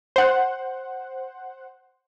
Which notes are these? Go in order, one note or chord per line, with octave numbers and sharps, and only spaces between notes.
C5 F#5